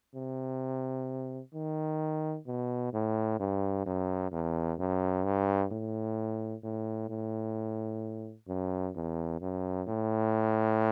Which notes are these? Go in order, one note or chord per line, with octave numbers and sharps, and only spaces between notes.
C3
D#3
B2
A2
G2
F#2
E2
F#2
G2
A2
A2
A2
F#2
E2
F#2
A2